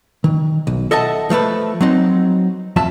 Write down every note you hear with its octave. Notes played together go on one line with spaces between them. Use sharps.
D#3
B1
A4 D#5 E5 F#5 A5
F3 A3 A4 B4
F#3 C4 D#4
F2 F3 E5 A5